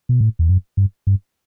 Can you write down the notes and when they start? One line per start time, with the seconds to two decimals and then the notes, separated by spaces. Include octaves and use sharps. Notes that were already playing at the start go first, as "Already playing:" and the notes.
0.09 B2
0.21 A2
0.39 E2
0.49 F#2
0.77 G2
1.07 G2